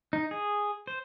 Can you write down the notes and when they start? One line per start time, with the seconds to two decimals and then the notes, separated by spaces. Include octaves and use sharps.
0.13 D#4
0.31 G#4
0.87 C5